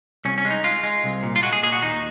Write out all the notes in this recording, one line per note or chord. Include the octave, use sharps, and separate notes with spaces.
C2 C#4
C#4
G#3
D#4
G#3 F4
G#3
C2
A#2
F4
G#3 F#4
G#4
A#2 G#4
F#4
D#2 D#4